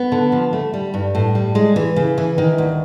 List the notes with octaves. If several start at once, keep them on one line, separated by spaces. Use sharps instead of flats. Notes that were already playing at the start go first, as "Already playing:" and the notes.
Already playing: B3
D3
F3
A3
G3
G2
A2
G3
G#3
E3
C#3
E3
D#3
D2